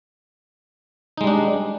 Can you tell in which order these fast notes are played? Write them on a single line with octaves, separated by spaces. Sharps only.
D#4 G#3 G3 D4